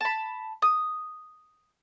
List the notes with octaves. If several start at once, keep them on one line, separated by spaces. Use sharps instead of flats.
A5 B5
D#6